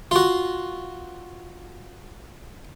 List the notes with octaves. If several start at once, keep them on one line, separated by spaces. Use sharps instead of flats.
F4 F#4